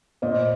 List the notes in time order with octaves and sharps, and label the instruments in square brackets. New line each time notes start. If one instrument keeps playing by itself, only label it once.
[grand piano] A#2 [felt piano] C5 D#5